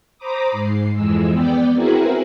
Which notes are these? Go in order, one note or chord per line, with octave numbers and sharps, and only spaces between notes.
C5 A#5 B5 D6 D#6
G#2 C7
F2 E3 G#3 E6
B3 D5 G5
C4 E4 F#4 G#4 A#4 B4